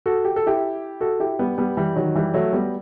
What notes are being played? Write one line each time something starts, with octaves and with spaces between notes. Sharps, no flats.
F#4 A4
G4
A4
E4 G4
F#4 A4
E4 G4
G3 B3
G3 B3
E3 G3
D#3 F#3
E3 G3
F#3 A3
G3 B3